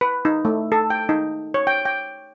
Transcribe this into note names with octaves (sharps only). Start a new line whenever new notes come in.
B4
D#4
A3
A4
G5
D#4
C#5
G5
G5